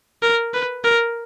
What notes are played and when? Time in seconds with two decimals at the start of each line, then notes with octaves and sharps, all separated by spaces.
0.23 A#4
0.54 B4
0.84 A#4